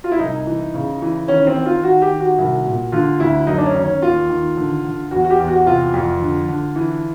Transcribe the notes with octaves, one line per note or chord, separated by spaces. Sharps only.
F4
E4
C2 D#4
E3
C#3
E3
D#3 C#4
C4
D#3
F4
D#3 F#4
G4
D#3
F#4
C2
A#2
D3 F4
D2 E4
F#2 D#4
D4
C#4
D#3
C#4
D#2 F4
D#3
D3
D3
E2 F#4
F#4
G4
E2
F#4
C3 F4
F2
D3
D3
E3